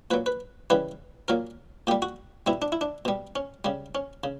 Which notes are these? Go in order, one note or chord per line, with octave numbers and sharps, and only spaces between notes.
A#2 F#3 B4
B4
C#3 E3 G3 B4
A#2 F#3 A#4
A#2 G3 G4
F#4
B2 G3 E4
D4
E4
D4
B2 G3
C#4
C#3 G3
C#4
C#3